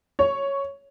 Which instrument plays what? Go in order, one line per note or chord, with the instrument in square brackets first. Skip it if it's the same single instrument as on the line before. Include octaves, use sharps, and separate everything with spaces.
[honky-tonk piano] C#5